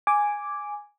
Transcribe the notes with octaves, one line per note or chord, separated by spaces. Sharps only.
G#5 D6